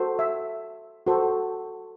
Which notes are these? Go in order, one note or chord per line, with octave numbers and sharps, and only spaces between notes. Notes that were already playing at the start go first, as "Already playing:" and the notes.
Already playing: F#4 A4 C5
E5
F#4 A4 C5